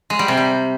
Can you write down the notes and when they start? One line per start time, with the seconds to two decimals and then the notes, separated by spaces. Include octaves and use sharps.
0.10 G#3
0.19 G3
0.28 C3
0.37 G3